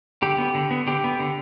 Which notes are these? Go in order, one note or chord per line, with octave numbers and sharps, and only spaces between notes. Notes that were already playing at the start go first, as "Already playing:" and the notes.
D3 G4
B3
D3
B3
D3 G4
B3
D3